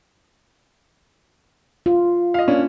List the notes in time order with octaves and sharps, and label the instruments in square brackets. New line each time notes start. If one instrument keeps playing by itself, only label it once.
[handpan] F4
[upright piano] D#5 F5
A#3 C#4 D4